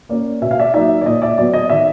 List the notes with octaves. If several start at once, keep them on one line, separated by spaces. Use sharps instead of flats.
A#3 C#4 D5
B2 E5
F5
D5 E5
F#3 A#3 D#4 D5 E5
D5
A#2 D#5
D5 E5
F#3 B3 D5
D#5
D#3 D5 E5